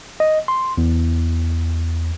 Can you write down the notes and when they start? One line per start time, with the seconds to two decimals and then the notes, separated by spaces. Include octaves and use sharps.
0.20 D#5
0.48 C6
0.78 E2